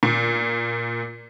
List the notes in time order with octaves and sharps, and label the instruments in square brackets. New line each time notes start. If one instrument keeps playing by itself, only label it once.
[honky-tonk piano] A#2